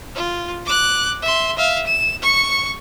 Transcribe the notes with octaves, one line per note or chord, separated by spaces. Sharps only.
F4
D6 F#6
E5 C6
E5 F5
E7
C#6 C#7